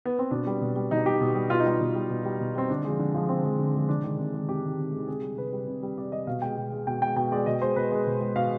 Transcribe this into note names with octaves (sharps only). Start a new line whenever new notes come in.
B3
C4
B2 D4
G3
B2
G3
B2 D#4
G3 G4
B2
G3
B2 F4
D#4
G3 F4
B2
G3
B2
G3
B2
G3 C4
D3 D4
F3 G#3
D3
F3 G#3
D3 C4
F3 G#3
D3
F3 G#3
C3 D4
D#3 G#3
C3
D#3 G#3
C3 G4
D#3 G#3
C3
D#3 G#3
C3 G#4
G3
C3 B4
G3
C3
G3
C3 D5
G3 D#5
B2 F5
G#3 G5
B2
G#3
B2 G5
G#3 G5
B2 G5
G#3 D5
B2 D#5
G#3 C5
B2 B4
G#3
B2
G#3
B2 F5